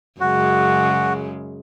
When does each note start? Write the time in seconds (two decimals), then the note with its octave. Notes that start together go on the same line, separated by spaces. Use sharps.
0.20 F#2 C#3 G#3 F#4